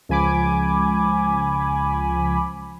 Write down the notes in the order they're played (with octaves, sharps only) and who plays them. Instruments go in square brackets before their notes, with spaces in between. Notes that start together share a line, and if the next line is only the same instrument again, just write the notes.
[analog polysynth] C#2 F3 G#5 B5 D6